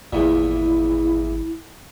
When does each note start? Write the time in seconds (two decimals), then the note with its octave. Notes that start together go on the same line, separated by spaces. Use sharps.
0.13 G#1 E2 A#2 E4